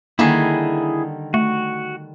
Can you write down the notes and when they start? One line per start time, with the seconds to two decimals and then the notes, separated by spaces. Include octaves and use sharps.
0.19 D3 D#3 G3 A#3 E4 G#4 G#5
1.34 A3 F#4